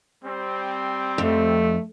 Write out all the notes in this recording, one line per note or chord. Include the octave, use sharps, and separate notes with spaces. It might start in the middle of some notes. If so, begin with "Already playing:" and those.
G3 C4
F2 A3